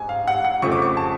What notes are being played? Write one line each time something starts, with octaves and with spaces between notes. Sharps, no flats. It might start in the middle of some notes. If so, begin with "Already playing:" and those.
Already playing: A1 G#2 G#5
F5
F#5
F#5
F2 C#3 F3 A3 C#6
D6
C#6
A5